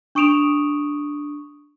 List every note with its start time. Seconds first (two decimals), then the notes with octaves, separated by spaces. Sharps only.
0.15 D4 C#6 D#6 D7 E7 F7